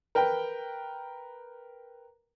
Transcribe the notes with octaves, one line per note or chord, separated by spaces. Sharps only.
A#4 B4 G5